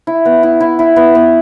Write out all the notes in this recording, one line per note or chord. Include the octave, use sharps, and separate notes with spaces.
E4
B3
E4
E4
E4
B3
B3